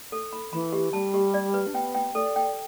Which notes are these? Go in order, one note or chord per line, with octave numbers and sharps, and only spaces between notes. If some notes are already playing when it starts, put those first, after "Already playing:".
A4
B5
E3 B5
G4
G3 A5
G4
D5
B4
D4
B3 G5
G5
A4 D5
G5